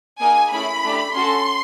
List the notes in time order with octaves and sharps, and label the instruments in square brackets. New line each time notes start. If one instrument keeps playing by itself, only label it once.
[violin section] A#3 D#4 G#4 G#5
A3 C#4 E4 G#4 B5
A3 D4 G4
C#4 F#4 A4 C6